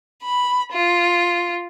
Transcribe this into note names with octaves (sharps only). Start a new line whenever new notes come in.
B5
F4